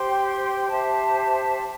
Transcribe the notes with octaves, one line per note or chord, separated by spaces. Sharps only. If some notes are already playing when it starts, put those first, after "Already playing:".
Already playing: G4 C5 G5 C6
G4 C5 E5 A5